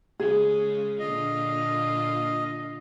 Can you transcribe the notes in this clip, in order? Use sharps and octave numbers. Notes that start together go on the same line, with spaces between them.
C#3 G#3 G#4
A#2 D3 F4 D#5